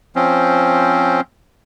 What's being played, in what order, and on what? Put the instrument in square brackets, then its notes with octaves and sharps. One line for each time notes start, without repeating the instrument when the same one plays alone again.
[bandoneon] F3 C4 C#4